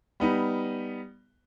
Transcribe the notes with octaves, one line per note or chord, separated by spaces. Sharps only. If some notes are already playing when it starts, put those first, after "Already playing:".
G3 B3 D#4